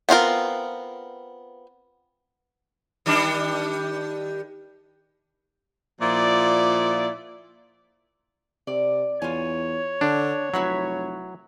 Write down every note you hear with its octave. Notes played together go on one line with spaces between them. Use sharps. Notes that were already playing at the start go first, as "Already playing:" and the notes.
B3 C4 F4 A#4
D#3 G3 D4
A#2 F3 E4 D5
C3 D5
E2 F4 C#5 G#5
D3 D4
F1 F#3 E4 F#4 B4